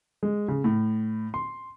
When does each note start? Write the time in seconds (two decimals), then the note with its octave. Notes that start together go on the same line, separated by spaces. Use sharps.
0.23 G#3
0.48 C#3
0.64 A2
1.34 C6